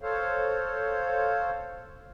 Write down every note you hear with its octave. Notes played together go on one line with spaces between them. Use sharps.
A4 C5 C#5 F5